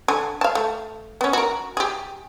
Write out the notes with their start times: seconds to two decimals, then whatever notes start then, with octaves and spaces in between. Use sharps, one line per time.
0.08 D3 G#5
0.41 F5 A5
0.55 A3
1.21 B3 C#4
1.33 F#4 A#4
1.77 G4 G#4